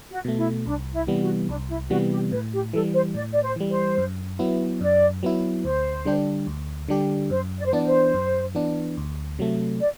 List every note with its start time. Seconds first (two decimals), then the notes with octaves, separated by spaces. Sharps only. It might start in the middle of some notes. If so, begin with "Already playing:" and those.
0.10 F#4
0.24 B2 A3
0.38 E4
0.65 C2 D4
0.93 E4
1.07 C3 E3 G3 B3
1.21 F#4
1.48 C2 D4
1.69 E4
1.90 C3 E3 G3 B3 F#4
2.12 G4
2.32 A2 B4
2.53 G4
2.73 E3 A4
2.77 G3
2.94 C5
3.14 A2 D5
3.33 D5
3.43 C5
3.56 E3 G3
3.71 C5
3.98 F#2
4.39 F#3 B3 E4
4.81 F#2 D5
5.23 F#3 B3 E4
5.64 D2 C5
6.05 D3 G3 D4 G4
6.47 D2
6.88 D3 G3 D4 G4
7.30 F#2 C5
7.58 D5
7.65 C5
7.73 E3 B3 D4 D5
7.86 C5
8.14 F#2
8.55 E3 B3 D4
8.97 D2
9.38 C3 F#3 A3
9.80 D5